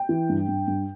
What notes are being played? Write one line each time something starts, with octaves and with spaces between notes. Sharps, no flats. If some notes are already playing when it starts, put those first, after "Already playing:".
Already playing: G5
E3
G2
G2
G2